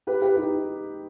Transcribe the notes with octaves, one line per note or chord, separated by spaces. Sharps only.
G4 B4
G4 B4
D#4 G4